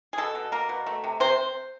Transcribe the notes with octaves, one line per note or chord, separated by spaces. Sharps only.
G#4
B2 A4
B2
A#3 A#4
B2
A3
C3
C3 C5